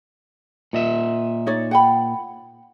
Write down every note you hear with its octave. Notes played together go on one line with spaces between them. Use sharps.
A#2 D#5 E5
D#4 C#5 D5
F#5 G5 B5